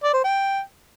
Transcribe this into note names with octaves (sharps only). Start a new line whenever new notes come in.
D5
C5
G5